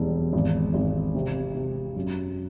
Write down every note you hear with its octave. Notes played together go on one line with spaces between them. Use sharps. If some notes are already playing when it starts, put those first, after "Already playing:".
Already playing: E1 G3
G#1
G#1
C3
C3
F#2